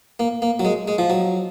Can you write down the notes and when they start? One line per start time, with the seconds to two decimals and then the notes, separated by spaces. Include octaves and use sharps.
0.20 A#3
0.42 A#3
0.59 F#3
0.65 G#3
0.88 G#3
0.98 F3
1.10 F#3